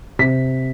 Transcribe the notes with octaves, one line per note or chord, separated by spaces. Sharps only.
C3 B6